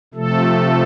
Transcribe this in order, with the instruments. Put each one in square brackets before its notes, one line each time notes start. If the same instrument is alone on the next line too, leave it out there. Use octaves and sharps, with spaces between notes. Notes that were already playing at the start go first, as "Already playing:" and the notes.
[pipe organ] C3 F3 A3 A4